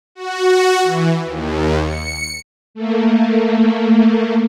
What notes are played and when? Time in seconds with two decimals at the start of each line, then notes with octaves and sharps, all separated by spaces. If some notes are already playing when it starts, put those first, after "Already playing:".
0.15 F#4
0.83 E3
1.25 D#2
1.84 C#7
2.75 A3 A#3